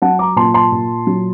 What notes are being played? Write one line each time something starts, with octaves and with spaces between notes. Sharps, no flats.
F#3 F#5 A5
A#5 D6
A#2 A5 C6
A5 C6
A#2
F#3